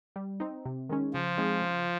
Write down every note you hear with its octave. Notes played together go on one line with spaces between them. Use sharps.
G3
C4 D#4
C3
D#3 G#3 C#4
C#3 F3
G#3 C4 D#4 G#4
C#3